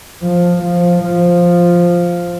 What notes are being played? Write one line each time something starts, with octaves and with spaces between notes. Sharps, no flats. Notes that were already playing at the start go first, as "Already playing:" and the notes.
F3
F3
F3